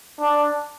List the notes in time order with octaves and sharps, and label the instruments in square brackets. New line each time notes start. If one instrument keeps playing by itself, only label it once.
[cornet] D4